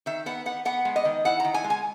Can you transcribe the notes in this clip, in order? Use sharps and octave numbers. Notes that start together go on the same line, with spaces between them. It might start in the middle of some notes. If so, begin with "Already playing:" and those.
D#3 E5
B3 F#5
B3 F#5
B3 F#5
G#3
D#5
D#3
E4 F#5
D#3 A#5
G#5
G#3
G#5